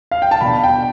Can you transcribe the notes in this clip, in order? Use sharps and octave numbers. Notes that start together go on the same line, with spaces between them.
F5
G5
A5
B2 B3 D4 B5
G5